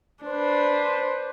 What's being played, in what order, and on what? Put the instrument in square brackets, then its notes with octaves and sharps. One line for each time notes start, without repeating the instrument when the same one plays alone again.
[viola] D4 [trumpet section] B4 C5